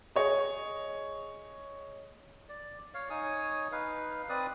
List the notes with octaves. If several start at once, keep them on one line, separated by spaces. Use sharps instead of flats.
G#4 C#5 D#5
D5
C#5 F5
D#4 C#5 G#5 D#6
D#4 B4 F5
C4 B4 D5 D#6